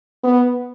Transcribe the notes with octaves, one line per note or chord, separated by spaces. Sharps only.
B3